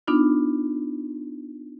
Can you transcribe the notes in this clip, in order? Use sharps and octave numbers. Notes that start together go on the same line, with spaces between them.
B3 D4 D#4 F4